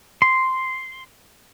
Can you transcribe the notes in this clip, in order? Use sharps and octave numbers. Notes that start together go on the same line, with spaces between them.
C6